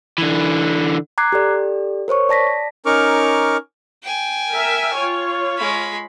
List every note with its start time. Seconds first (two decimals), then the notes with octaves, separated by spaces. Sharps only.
0.18 D3 E3
1.18 A#5 D6 F#6 G#6 C7
1.32 G4 A4 D5
2.08 A#4 C5 C#5 C#6
2.29 D5 A5 A#6 B6
2.86 C#4 D#4 A#4 C#6 D6 F6
4.03 G5 G#5
4.51 A#4 E5
4.95 F4 C#5
5.57 G#3 B5